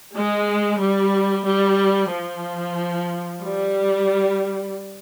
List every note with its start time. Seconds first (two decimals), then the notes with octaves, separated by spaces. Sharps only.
0.14 G#3
0.79 G3
1.45 G3
2.11 F3
3.42 G3